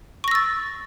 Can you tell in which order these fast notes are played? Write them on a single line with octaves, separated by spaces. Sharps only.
C#6 A#6 E6 A6